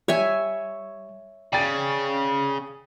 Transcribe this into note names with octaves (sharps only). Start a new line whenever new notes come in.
G3 C#5 E5 G#5
C#3 D5 G5 A6